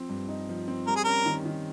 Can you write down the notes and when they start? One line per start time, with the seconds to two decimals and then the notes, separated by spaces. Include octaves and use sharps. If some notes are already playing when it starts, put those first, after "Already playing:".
Already playing: F3 C4
0.09 G2
0.29 D#4
0.49 F3
0.68 C4
0.87 G3 A#4
0.96 G#4
1.04 C#4 A#4
1.26 D#3
1.45 D#3